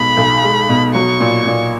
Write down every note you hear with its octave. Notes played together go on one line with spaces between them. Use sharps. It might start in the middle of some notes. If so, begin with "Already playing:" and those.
Already playing: B1 B2 G#3 B5
B1
G#3
B2
F#3 C#6
A#2
A#2